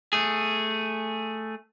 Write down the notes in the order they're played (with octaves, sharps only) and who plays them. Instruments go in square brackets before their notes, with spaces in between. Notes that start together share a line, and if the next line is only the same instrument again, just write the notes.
[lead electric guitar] A3 G#4